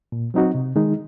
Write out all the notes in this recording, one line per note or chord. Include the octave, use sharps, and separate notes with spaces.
A#2
F#3 C4 D#4 F#4
C3
D#3 G#3 D#4